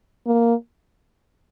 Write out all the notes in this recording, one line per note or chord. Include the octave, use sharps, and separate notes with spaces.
A#3